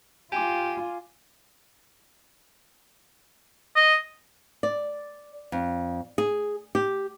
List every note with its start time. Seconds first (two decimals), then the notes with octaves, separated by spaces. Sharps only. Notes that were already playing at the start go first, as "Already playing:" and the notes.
0.32 F4 G4 G#5 D6
3.76 D#5
4.63 D5
5.52 F2
6.18 G#4
6.75 G4